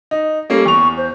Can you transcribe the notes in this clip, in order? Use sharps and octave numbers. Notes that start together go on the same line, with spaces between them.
D#4
G3 A#3 C#4 A4
E2 C#6 F7
C5